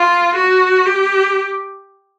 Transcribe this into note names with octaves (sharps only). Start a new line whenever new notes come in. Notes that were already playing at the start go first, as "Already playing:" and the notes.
Already playing: F4
F#4
G4